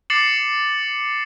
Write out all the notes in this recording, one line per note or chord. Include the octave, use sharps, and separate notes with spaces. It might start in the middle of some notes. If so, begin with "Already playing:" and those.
D6 A6 C7 C#7 E7 F#7